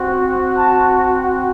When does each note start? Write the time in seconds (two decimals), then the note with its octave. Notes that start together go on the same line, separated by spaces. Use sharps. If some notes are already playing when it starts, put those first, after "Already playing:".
Already playing: C4 F#4
0.58 A5